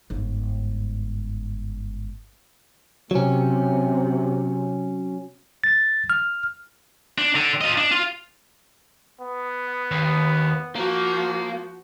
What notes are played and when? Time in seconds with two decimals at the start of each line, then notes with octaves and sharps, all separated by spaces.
0.10 G1 G#2
3.11 C3 F#3 C#4
5.64 A6
6.10 F6
7.18 D4
7.36 D3
7.61 F4 D#5
7.78 D4
7.91 F4
9.21 B3
9.91 D#2
10.76 F3 A#3 F#4